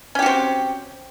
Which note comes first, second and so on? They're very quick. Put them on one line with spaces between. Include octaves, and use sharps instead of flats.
C#4 G4 F#4 C4